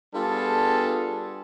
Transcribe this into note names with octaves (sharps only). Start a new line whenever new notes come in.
G3 B3 D4 F4 G#4 A4